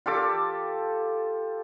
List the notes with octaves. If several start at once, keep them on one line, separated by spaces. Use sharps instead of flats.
F4 G4 A4 D6